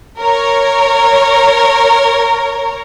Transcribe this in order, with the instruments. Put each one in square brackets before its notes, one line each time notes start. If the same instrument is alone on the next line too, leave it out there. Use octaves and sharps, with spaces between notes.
[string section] A#4 C#5